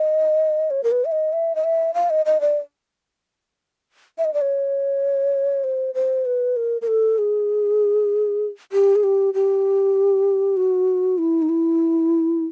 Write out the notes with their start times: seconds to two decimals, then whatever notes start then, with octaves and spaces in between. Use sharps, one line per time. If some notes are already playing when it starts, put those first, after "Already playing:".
Already playing: D#5
0.71 C#5
0.84 A#4
0.92 B4
1.05 E5
1.12 D#5
1.33 E5
1.56 D#5
1.64 E5
1.94 F5
2.10 D#5
2.26 D#5
2.41 D5
4.18 E5
4.25 D#5
4.34 D5
4.41 C#5
5.64 C5
5.95 C5
6.26 B4
6.56 A#4
6.82 A#4
6.88 A4
7.18 G#4
8.72 G4
8.96 G#4
9.04 G4
9.34 G4
10.57 F#4
11.18 E4
11.42 D#4
11.49 E4